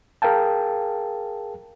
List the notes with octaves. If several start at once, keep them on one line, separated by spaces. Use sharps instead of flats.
G#4 A#4 F5 G5 A5